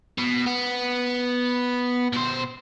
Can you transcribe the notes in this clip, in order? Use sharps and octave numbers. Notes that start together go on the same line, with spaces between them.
B2
B3
B2 C5